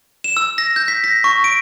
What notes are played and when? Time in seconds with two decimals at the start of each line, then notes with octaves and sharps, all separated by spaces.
0.24 E7
0.37 E6
0.58 A#6
0.76 G6
0.88 B6
1.04 A#6
1.24 C#6
1.44 D7